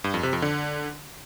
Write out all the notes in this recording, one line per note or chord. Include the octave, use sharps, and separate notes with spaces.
G2
F2
C3
F2
D3